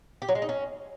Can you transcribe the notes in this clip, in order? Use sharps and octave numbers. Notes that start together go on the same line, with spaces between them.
G4
F#3
G#3
D#4
C#4